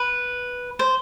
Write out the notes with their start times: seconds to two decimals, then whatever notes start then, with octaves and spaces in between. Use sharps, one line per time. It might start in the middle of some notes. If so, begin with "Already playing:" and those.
Already playing: B4
0.79 C5